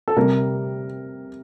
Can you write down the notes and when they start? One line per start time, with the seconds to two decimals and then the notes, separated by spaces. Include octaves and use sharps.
0.08 A4
0.16 C3 G3 A#4